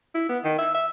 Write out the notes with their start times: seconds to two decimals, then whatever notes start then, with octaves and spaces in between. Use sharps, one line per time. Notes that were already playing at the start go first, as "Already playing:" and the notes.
0.15 E4
0.29 B3
0.44 D#3
0.58 E5
0.74 E5